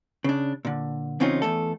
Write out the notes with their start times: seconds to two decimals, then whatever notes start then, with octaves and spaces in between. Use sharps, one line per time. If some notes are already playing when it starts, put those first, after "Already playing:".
0.24 C#3 D4
0.65 A#2 D3
1.20 E2 C#3 C4 C#4 D#4 F4
1.42 E2 G2 A3 A4